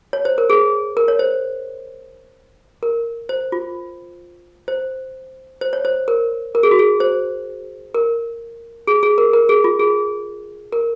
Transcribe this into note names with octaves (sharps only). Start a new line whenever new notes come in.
C#5
C5
A#4
G#4
A#4
C#5
C5
A#4
C5
F4
C5
C5
C#5
C5
A#4
A#4
G#4
F#4
G#4
C5
A#4
G#4
G#4
A#4
A#4
G#4
F4
G#4
A#4